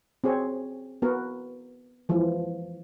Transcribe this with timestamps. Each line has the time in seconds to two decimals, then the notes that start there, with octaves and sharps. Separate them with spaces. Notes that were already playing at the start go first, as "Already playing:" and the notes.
0.24 C4 F#4 G#4 C#5
1.02 B3 F#4 A#4
2.09 E3 F3 G#3